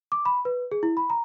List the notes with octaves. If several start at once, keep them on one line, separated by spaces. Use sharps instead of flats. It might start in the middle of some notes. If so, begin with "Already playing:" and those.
D6
B5
B4
G#4
E4
B5
A#5